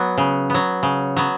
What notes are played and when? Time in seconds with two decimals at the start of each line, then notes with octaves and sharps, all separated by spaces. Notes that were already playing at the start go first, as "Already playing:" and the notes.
Already playing: F#3 B3
0.18 C#3
0.50 F#3 B3
0.83 C#3
1.17 F#3 B3